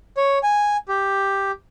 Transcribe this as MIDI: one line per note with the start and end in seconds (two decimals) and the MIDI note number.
0.17 0.38 73
0.43 0.77 80
0.89 1.51 67